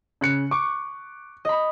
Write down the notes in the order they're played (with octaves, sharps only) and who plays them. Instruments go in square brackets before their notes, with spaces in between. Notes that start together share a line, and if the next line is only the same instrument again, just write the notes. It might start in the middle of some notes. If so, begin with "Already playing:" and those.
[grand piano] C#3 F#6 C#7
[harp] C#6 [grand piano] D6
[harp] D#5 B5